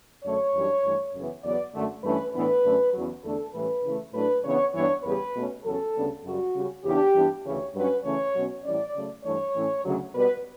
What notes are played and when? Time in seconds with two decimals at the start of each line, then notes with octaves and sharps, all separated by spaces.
0.24 F#2 D3 A3 C#5
0.54 F#2 E3 G3 D4
0.84 G2 E3 A3
1.13 F#2 C#3 E3 B3
1.43 E2 C#3 F#3 B3 D5
1.74 F#2 D3 A3
2.04 G2 E3 A3 C#4 B4
2.34 A2 E3 B3 D4 B4
2.64 F#2 D3 A3 C#4
2.94 E2 C#3 F#3
3.24 E2 D3 A3 D4 A4
3.54 A2 E3 G3 C#4 B4
3.84 C#3 E3 A3
4.14 A2 F#3 A3 D4 B4
4.44 C#3 E3 B3 D4 C#5
4.74 G2 E3 B3 D4 C#5
5.04 E2 C#3 G3 B4
5.34 B2 A3 C#4
5.64 E2 C#3 F#3 C#4 A4
5.94 D2 C#3 G3 B3 D4
6.24 F#2 C#3 G3 F#4
6.55 C#3 G3 C#4
6.84 E2 C#3 E3 B3 D4 G4
7.14 G2 E3 B3 D4
7.44 D2 C#3 E3 C#5
7.74 G2 F#3 C#4 B4
8.04 C#3 E3 A3 C#4 C#5
8.34 B2 F#3 C#4
8.64 A2 E3 G3 C#4 D5
8.95 C#3 F#3 A3
9.24 G2 E3 A3 D4 C#5
9.54 A2 E3 A3 C#4
9.84 D2 C#3 F#3
10.14 B2 G3 B3 B4